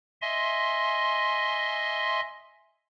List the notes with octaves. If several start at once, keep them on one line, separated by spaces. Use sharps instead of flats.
D#5 E5 G#5 C6